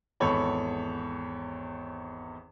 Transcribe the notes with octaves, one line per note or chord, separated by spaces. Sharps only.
G#1 E2 A4 C#5 B5